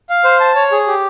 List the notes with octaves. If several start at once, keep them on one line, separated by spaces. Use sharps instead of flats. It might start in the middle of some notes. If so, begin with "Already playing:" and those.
F5
C5
A5
C#5
G#4
G4